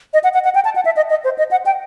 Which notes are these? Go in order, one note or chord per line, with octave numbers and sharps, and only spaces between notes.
D#5
F#5
F#5
F#5
G5
A5
F#5
E5
D#5
D#5
C5
D#5
F#5
G5